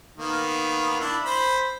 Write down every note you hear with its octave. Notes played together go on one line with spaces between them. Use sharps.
D#3 A#3 B3
D4 E4
C5 B5